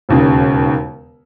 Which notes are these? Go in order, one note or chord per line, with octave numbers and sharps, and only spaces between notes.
E1 D#2 C#3